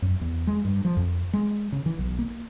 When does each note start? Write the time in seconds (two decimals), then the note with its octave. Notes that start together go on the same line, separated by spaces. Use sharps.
0.02 F#2
0.21 E2
0.47 G#3
0.65 G2
0.85 F3
0.97 F2
1.33 G#3
1.72 C#3
1.86 E3
1.99 B1
2.19 A#3